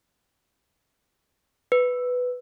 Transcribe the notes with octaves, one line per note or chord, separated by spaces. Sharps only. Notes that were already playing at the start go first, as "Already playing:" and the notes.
B4